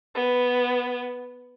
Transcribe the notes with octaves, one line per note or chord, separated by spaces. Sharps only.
B3